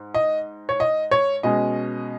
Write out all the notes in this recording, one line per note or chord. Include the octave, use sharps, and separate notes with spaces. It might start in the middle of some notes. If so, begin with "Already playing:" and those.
Already playing: G#2
D#5
C#5
D#5
C#5
B2 G#3 C#4 D#5